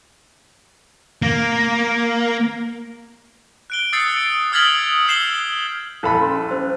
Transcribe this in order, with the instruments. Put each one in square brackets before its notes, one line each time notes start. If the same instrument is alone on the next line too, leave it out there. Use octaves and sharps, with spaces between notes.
[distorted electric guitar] A#3
[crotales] F#6 D7 G7
D#6 E6 G6 A6 C7 C#7
D7
D#6 F6 G#6 A6 B6 F#7
D#6 E6 G6 C7 E7 G7
[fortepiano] A#1 A4 B5 [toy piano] E4
[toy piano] C#4 C6 D#6
C#4 C5 E6